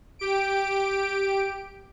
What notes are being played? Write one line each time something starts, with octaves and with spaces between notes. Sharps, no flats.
G4 D7